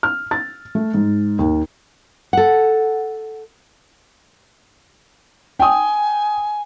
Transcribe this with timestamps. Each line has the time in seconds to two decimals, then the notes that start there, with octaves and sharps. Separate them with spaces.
0.03 F6
0.31 A6
0.75 A3
0.94 G#2
1.39 D#2
2.33 A4 F#5
5.59 G5 G#5 D#6